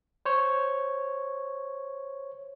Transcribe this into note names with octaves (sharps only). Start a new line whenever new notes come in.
C5 C#5